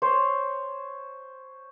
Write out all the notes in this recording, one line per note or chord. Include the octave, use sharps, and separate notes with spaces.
C5 C#5 C6